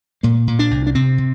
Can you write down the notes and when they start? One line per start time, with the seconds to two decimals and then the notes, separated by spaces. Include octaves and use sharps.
0.23 A#2 A#3
0.47 A#2
0.59 D4
0.71 C2
0.87 D4
0.95 C3 C4
1.18 C3